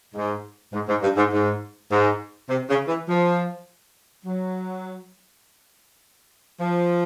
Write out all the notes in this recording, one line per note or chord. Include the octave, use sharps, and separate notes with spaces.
G#2
G#2
G#2
G2
G#2
G#2
G#2
C3
C#3
E3
F3
F#3
F3